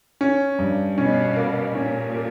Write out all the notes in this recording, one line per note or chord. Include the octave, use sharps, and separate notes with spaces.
C#4
G2
B2 C#4
A#3
A#2 C#4
A#3